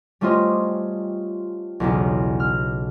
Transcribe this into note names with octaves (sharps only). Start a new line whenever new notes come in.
G3 A3 C#4 F4 C5 D#5
B1 E2 C#3
F6